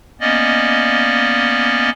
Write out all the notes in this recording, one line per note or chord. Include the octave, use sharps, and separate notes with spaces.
A#3 B3 C#4 D5 D#5